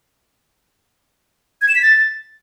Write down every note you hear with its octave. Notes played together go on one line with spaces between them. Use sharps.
G#6
E7
B6
A6